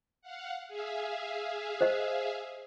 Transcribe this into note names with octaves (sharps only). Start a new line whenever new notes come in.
F5 F#5
G#4 E5 F5
C5 D#5